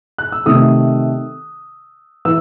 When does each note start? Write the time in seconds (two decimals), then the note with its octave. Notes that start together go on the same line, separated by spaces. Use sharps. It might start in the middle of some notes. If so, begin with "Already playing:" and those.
0.18 F#6
0.32 E6
0.46 C3 D#3 A3 D#6
2.25 E3 E6